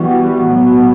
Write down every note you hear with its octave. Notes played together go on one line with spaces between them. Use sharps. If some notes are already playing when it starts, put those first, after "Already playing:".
Already playing: E3 G3 B3 F#4
A2 F#3 B3